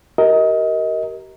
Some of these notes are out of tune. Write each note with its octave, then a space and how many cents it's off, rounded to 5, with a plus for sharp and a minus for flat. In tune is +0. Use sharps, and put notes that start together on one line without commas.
G4 -35 A#4 +0 D#5 +25